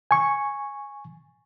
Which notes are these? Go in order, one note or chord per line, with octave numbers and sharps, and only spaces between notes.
G#5 C#6